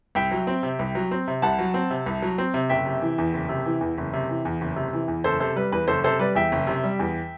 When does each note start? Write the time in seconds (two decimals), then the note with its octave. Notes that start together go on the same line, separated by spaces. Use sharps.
0.15 C2 E5 G5
0.31 F#3
0.47 C4
0.63 C3
0.79 C2
0.95 F#3
1.11 C4
1.28 C3
1.42 C2 F#5 A5
1.59 F#3
1.74 C4
1.90 C3
2.06 C2
2.22 F#3
2.38 C4
2.54 C3
2.69 F#1 E5 G5
2.86 C3
3.02 E3
3.18 E2
3.33 F#1
3.49 C3
3.66 E3
3.81 E2
3.98 F#1
4.13 C3
4.30 E3
4.45 E2
4.61 F#1
4.76 C3
4.93 E3
5.08 E2
5.24 F#1 A4 C5
5.40 C3 A4 C5
5.56 G3 B4
5.72 E2 B4
5.88 F#1 A4 C5
6.04 C3 A4 C5
6.19 G3 B4 D5
6.35 E2 E5 G5
6.52 F#1
6.67 C3
6.83 G3
6.99 E2